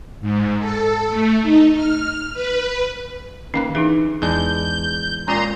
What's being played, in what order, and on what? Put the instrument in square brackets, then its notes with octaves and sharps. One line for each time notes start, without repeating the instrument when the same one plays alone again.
[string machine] G#2
A4
A3
D#4
F6
B4
[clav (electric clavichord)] D#3 A#3 B4 [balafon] C#4
[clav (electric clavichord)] E3 [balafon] D4 D#4 G#4
[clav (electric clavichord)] E2 G#3 D4 [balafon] G#4 [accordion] G6
[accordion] A#2 A#5 C6 [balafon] G#3 F4 [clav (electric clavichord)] C#4 D5